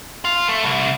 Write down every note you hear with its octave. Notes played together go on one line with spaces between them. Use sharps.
F4
A3
C2